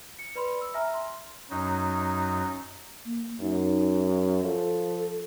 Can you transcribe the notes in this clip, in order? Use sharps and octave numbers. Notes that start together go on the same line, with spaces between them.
C#7
B4 D5 B5 C6
E6
E5 G#5 A#5 F6
C6
F#2 F#3 D#4
A#3
F#2 D#4
F3 A4